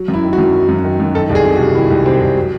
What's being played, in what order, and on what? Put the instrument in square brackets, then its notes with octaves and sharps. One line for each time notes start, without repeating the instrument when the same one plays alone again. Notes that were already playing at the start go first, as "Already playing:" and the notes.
Already playing: [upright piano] F#3
F#2
E4
D#3
F#4
F#2
F#3
F#2
D#3
F#2
D#3 A4
C2
G#4
C3
F#4
C2
D#3 E4
C2
C3 C4
C2
F#3